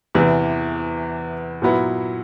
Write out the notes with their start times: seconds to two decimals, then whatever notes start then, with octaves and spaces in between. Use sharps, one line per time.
0.15 E2 C3 E3
1.62 A#2 F#3 B3 E4